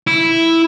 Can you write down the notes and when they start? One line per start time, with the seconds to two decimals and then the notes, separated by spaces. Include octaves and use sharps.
0.07 E4